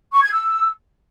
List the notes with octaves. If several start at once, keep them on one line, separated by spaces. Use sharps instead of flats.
C#6
G#6
E6